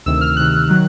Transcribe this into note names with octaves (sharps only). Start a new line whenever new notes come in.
D2 C3 D#3 E6
F6
D2 C3 D#3 F#6
D#3 F#3